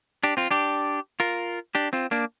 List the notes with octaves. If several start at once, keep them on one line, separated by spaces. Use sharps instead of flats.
D4 G4
C4 F4
D4 G4
F4 A#4
D4 G4
C4 F4
A#3 D4